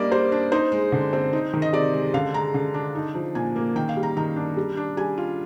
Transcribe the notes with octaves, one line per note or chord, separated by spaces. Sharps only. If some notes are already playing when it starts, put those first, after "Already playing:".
Already playing: G3 A#3 D4 D5 D#5
G3 C5
D4
D#4 C5
G#3
D3
C4
D#4
D#3
D#5
C3 D5
G#3
D3 F5
G#3 A#5
D3
D4
D#4
F3
A#2 G#5
A#3
D#3 G5
F5
G3
A#5
D#3 A#5
D4
G3
D4
G3 G#5
F4